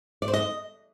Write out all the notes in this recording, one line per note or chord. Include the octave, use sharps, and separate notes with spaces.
D5
C5
D#5